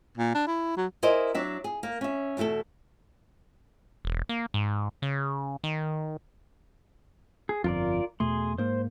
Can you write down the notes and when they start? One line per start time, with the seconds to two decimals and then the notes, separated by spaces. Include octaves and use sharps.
0.18 A#2
0.35 D4
0.47 E4
0.77 F#3
1.03 E4 G#4 A#4 C5 D5 D#5
1.34 F#3 D4 E5
1.64 G#4
1.83 A#3
2.01 C#4 E5
2.37 E2 B2 A3 E4 A4
4.05 E1
4.29 A#3
4.54 G#2
5.02 C#3
5.64 D#3
7.49 G#4
7.64 G1 F2 F4 A#4 D5
8.20 E2 B2 A3 G#4 C6
8.58 G#2 A#3 C5